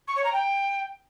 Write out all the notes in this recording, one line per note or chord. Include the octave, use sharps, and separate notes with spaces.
C#6
C#5
A#5
G5